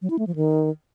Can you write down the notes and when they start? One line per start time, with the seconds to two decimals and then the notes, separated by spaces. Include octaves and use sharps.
0.02 F#3
0.10 E4
0.19 A3
0.27 F3
0.36 D#3